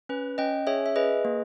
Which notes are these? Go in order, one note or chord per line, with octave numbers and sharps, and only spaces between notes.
C#4 B4
C#4 D#5 G5
G#4 C#5 E5
E5
G#4 B4 D#5
A#3